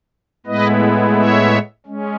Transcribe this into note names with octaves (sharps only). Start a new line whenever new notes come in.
A2 G#3 B3 E4 B4 D#5
C#5 E5
G#3 C#4